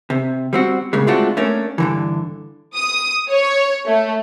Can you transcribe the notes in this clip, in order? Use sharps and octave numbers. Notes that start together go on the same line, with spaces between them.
C3
G3 C4 F#4
A#2 C#3 G3 G#3
G#3 A3 C4 D4 F4 F#4
A3 A#3 C#4 D4
G2 D3 E3
D#6
C#5
A3